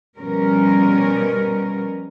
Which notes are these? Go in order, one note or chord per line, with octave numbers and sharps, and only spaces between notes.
B2 F3 G3 C#4 A#4